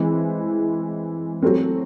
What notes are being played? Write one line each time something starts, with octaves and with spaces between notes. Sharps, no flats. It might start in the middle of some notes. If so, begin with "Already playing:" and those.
Already playing: E3 G#3 C4 E4
F#3 A3 C4